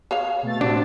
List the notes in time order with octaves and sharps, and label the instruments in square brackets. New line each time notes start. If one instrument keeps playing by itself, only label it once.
[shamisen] G#4 C#5 F5
[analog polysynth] B2 A3 A6
[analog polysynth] A2 C3 C4 [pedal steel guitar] D4 [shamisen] F#4